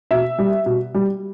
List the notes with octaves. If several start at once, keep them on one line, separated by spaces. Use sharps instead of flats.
B2 E5
G3
B2
G3